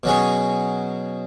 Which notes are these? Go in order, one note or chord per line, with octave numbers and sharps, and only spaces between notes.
B2 F#3 C#4 G#4